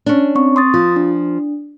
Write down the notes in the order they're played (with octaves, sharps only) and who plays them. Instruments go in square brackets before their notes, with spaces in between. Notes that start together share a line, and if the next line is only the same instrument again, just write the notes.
[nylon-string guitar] C#4 D4
[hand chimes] C4 C#6
C6 D#6 A6
[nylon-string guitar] F3 [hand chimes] F4
[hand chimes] D4